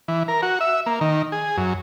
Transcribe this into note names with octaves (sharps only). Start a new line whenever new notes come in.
E3
A#4
F#4
E5
A#3
D#3
G#4
F#2